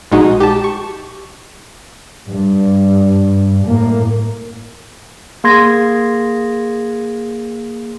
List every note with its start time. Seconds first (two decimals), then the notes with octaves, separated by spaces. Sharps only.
0.12 A#1 A#2 G#3 D#4 F#4
0.40 G4 A5
0.64 C#6
2.30 G2
3.65 A2 A#3
5.44 A#3 G#4 C6 G#6 A#6